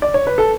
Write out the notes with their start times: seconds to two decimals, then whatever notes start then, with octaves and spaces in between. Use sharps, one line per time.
0.02 D5
0.14 C#5
0.27 B4
0.38 A4